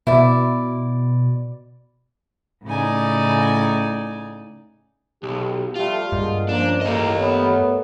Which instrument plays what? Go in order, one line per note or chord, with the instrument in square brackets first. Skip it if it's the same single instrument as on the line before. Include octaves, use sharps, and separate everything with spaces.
[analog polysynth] B2 [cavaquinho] E4 D5
[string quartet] A2 C#3 D#4 D5 G#5
[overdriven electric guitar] B1 [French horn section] G4
[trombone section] F3 G3 A3 [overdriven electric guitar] F4
[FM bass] G2 [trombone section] A#2 D3 G#3
[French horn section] F3 C#4 [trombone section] A#3 [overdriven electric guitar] D4
[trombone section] C#2 [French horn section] A2 A#3 A#4 [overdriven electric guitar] G4 D#5
[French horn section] A3 A#4 C#5 [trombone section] B3